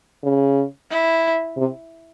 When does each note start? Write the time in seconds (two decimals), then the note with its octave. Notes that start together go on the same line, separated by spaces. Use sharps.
0.23 C#3
0.90 E4
1.57 C3